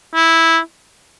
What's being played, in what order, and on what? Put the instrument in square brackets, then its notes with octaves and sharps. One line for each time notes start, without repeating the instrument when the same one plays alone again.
[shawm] E4